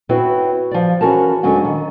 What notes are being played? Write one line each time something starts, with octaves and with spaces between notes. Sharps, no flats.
C4 E4 F#4 B4 C#5
F3 D5
E3 C#4 F#4 G#4 A#4 A5
D2 D3 F#3 G#3 C#4 F#5
D#3